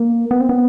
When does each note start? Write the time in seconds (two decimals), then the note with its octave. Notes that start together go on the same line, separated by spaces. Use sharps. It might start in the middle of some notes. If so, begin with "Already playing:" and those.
Already playing: A#3
0.31 B3
0.40 C4
0.49 B3